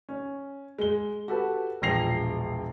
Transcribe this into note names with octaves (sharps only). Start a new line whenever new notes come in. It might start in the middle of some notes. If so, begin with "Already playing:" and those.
C#4
G#3 G7
F#4 G4 A4 B4 A5
E1 A#1 G5 A#6 C7 F7